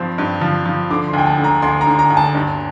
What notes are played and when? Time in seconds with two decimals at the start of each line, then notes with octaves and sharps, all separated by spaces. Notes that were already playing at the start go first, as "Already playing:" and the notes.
Already playing: G2 F3 C4
0.18 G2
0.41 F3
0.66 F3
0.91 D3 D6
1.08 C6
1.13 D2 G5
1.26 A5
1.38 D3
1.44 A#5
1.62 D2 C6
1.81 A#5
1.87 D3
1.99 A#5
2.10 D2
2.17 A5
2.35 G2